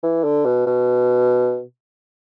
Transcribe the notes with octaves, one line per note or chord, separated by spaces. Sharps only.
E3
D3
B2
B2